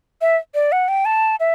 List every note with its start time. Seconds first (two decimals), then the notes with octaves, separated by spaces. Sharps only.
0.21 E5
0.55 D5
0.72 F#5
0.88 G5
1.05 A5
1.40 E5